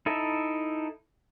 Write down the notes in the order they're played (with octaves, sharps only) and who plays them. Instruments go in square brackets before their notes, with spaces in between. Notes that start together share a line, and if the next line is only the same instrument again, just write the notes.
[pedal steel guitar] D#4 E4 A4 E5